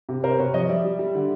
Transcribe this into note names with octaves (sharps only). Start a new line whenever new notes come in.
C3
C3 A#4 C5
C3 B4 C#5
F3 C#5 D#5
G3 D5 E5
G3
G3
D3